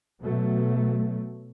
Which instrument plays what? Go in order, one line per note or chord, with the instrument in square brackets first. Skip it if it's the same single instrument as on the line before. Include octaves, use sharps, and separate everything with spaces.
[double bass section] B2 F#3 A3